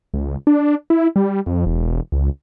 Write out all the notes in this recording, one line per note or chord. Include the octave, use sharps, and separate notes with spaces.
C#2
D4
E4
G3
F2
E1
C#2